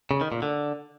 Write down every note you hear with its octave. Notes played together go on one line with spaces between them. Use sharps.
C#3
D#3
A#2
D3